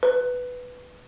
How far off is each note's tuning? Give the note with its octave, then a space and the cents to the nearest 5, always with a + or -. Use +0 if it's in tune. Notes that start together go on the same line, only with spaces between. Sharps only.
B4 +5